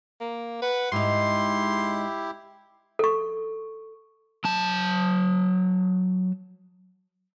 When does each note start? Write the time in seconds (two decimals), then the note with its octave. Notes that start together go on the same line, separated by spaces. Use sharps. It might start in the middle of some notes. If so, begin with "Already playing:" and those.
0.21 A#3
0.62 B4 F#5
0.92 G#2 D#4 E4 G4 C6
2.99 A4 C#6
4.45 F#3 A5